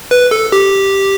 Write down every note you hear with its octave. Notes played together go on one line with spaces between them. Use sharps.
B4
A4
G4